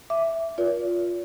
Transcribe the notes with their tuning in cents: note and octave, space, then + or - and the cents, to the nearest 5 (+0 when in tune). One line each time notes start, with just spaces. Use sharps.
E5 +5 D6 +0
F4 +5 A#4 +40 D5 -45